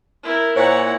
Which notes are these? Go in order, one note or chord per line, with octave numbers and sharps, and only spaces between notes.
E4 A#4
A#2 E4 C5 C#5 F#5 G#5